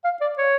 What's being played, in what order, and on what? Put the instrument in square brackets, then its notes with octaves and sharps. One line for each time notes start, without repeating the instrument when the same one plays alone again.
[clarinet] F5
D5
C#5